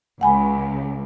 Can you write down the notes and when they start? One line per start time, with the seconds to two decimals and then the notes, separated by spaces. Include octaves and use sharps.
0.21 C#2 F#5 G#5 B5